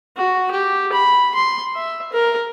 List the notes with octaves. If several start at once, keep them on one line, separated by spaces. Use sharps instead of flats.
F#4
G4
B5
C6
E5
A#4